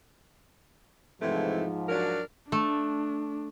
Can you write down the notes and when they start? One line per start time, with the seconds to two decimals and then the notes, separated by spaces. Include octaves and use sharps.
1.21 G#2 C3 E3 F3 A3 E4
1.88 F#3 D4 F#4 A#4
2.52 A3 D4